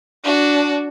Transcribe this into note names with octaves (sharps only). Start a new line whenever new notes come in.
D4 F#4